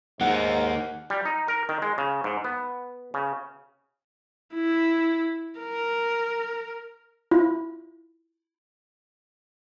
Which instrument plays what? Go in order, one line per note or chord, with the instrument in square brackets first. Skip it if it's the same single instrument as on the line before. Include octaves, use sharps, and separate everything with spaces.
[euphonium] G#2 [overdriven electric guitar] A#3 D#4 [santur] F#5
[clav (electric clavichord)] G3
D#4
A#4
D#3
G#3
C#3
G#2
B3
C#3
[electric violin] E4
A#4
[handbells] E4 F4